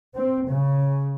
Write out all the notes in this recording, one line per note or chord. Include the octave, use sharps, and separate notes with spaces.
C4
C#3